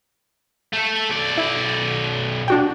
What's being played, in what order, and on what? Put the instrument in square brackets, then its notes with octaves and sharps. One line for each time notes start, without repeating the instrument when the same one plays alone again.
[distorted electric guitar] A3 A4
B1 D5
[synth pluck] E4
D4 F#4 G5